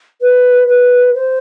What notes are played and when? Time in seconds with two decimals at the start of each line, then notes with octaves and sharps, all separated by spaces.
0.22 B4
0.68 B4
1.15 C5